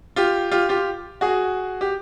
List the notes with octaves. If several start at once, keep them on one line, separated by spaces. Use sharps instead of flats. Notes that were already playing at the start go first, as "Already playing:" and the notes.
F4 G4
F4 G4
F4 G4
F#4 G#4
G4